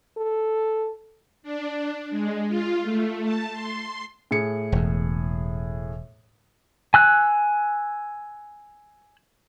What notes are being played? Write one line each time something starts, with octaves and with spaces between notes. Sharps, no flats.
A4
D4
G#3
F4
A3
A5
C6
A2 G#4 C#7
E1 E2
G#5 E6 F#6